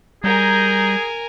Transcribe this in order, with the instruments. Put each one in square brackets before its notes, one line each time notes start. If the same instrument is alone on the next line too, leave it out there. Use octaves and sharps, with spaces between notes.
[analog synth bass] G3 [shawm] G#4 [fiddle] A#4 G#5 [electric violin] A#5 G6